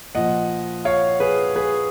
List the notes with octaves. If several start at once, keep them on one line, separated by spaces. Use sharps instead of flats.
A#2 F3 D#5 F#5
C#5 F5
G#4 B4
G#4 B4